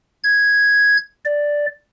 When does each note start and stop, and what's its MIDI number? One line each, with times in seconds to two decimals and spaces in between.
0.24 0.97 92
1.25 1.66 74